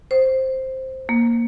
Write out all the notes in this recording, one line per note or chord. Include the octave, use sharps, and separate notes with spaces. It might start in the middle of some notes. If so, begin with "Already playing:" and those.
C5
A#3